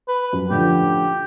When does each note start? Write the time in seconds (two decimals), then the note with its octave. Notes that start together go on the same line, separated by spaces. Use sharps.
0.08 B4
0.33 F#2
0.50 A2 D3 F3 G4